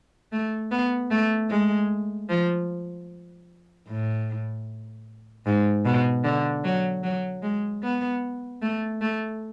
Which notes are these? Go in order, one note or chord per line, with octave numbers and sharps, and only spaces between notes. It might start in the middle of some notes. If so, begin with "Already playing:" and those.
A3
B3
A3
G#3
F3
A2
G#2
B2
D3
F#3
F#3
G#3
B3
A3
A3